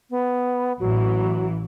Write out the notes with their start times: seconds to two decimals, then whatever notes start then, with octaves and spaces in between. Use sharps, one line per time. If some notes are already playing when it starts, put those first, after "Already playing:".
0.10 B3
0.80 A1 E3 F#3